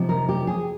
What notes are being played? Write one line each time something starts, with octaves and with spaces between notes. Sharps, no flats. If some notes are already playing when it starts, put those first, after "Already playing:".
Already playing: C3 F3 C4 D#4
A#4
G4
G#4